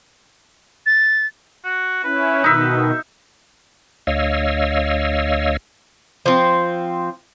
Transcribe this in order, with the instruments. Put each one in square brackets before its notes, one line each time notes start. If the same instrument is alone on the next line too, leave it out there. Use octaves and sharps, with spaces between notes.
[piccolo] A6
[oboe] F#4
[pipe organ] C#4 E4 [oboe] B4
[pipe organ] B2 D#3 [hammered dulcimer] D#4 E5
[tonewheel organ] D2 C#5 D#5 F5 E6
[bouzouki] F3 C4